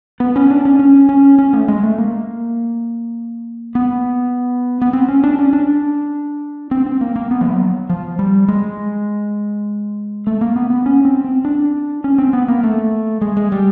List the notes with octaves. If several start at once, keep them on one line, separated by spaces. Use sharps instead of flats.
B3
C#4
D4
C#4
C#4
C#4
C#4
A3
G#3
A3
A#3
B3
B3
C4
C#4
D4
C#4
D4
C4
C4
A#3
A#3
B3
F3
F#3
F3
G3
G#3
A3
A#3
B3
B3
C#4
C4
C4
D4
C#4
C4
B3
A#3
A3
G#3
G#3
G3